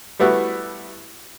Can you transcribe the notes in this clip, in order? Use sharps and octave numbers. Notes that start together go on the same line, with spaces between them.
G3 A3 B3 E4 F#4